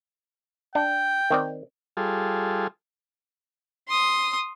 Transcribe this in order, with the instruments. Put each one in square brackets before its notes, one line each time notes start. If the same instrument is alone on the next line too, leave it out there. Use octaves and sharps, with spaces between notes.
[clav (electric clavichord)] D4 [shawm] G5
[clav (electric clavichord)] D#3 C4 D5
[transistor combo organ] G3 F4 G#4 A4
[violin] C6 D#6